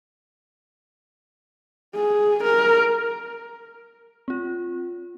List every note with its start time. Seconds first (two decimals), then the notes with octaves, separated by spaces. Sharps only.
1.95 G#4
2.44 A#4
4.28 C4 F4